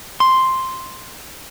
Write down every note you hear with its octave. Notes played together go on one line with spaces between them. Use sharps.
C6